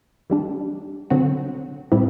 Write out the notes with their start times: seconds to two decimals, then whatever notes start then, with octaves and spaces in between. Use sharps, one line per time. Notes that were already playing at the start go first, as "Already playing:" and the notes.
0.30 E3 G3 D4
1.10 D3 F#3 C4 F#4
1.92 A2 G3 C4 E4